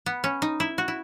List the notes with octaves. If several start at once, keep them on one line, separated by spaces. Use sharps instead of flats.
B3
C#4
D#4
E4
F#4
E4